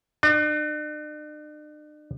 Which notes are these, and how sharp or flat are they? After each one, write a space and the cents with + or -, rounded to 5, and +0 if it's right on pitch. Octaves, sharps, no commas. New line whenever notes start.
D4 +45